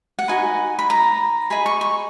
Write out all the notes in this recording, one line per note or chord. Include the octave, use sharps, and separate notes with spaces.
F#5
D#4 F#4 B4 D#5 G#5
B5
A#5
G#4 D#5 B5
C#6
C#6